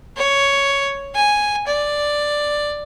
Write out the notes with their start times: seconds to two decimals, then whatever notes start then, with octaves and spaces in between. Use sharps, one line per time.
0.17 C#5
1.14 G#5
1.67 D5